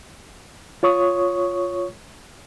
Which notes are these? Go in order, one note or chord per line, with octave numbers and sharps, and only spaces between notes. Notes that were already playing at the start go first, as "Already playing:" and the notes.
F4 C#5 C#6 D#6